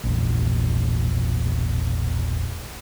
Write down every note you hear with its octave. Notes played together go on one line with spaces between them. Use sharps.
E1 A#1